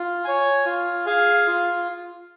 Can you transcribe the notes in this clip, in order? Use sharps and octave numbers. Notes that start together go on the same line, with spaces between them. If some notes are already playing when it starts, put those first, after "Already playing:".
Already playing: F4
C#5 G#5
F4
G#4 F5 G#5
F4